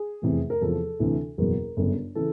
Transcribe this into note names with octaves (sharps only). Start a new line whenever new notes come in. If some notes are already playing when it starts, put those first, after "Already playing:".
Already playing: G#4
F1 E2 C3 E3
A#4
E2 C3 F3 A4
D2 C3 E3
F#1 E2 B2 F#3 A#4
G1 F#2 C#3
C#3 E3 A4